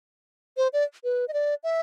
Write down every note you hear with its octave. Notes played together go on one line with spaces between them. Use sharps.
C5
D5
B4
D#5
D5
E5